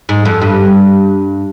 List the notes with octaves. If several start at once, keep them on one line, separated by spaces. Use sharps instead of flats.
G#2
F2
G2